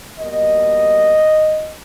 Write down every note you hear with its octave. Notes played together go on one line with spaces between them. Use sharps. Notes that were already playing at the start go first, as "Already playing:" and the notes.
B2 G3 A#3 D#5